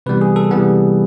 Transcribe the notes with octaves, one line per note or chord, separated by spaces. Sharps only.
C3 E3 G3 B3 B4
G#4
A4
C3 E3 G3 B3